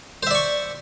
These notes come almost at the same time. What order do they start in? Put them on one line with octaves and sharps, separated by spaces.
C5 E5 D5 C#6